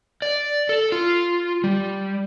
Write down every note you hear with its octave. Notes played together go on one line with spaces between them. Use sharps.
D5
A4
F4
G3